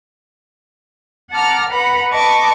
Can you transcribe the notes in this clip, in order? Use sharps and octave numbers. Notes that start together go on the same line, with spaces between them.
F#5 A5 A#5 D6 F6
B4 F#5 A#5 B5
B4 D#5 A5 C#6 D6